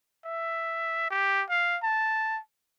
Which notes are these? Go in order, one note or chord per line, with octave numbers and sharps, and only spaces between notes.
E5
G4
F5
A5